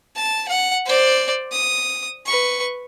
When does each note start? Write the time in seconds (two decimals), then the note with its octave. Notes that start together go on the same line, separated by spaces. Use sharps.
0.15 A5
0.48 F#5
0.86 C5 D5
1.51 D#6
2.26 B4 C#6